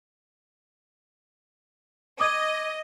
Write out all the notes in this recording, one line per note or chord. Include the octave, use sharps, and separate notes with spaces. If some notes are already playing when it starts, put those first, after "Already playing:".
D#5 D6 D#6 G#6